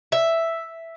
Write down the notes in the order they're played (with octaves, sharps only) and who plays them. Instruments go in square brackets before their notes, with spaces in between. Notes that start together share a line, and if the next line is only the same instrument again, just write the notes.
[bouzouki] E5